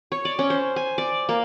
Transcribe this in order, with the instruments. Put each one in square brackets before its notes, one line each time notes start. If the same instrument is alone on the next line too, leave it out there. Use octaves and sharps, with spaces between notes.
[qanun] C#5
D5
C#4
C5
G#5
D5
A#3